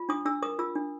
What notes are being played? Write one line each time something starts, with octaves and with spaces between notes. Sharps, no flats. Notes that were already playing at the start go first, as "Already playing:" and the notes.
Already playing: F4
D4 D#6
D4 E6
A#4 D#6
F4 E6
D4